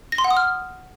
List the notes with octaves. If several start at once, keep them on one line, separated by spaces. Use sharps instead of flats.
A#6
C6
F#5
D#6
F6